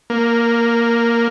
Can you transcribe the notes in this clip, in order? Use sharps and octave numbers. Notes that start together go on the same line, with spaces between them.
A#3